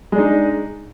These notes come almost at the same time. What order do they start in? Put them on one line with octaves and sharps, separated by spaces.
G#3 D4 D#4